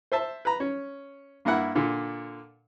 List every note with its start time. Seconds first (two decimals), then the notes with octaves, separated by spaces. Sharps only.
0.12 C5 E5 A5
0.45 B4 A#5
0.60 C#4
1.45 G2 A#3 E4 F#5
1.75 A#2 D3